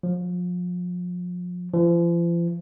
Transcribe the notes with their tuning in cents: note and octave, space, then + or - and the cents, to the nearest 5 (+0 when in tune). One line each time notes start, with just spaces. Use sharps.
F3 +35
F3 -40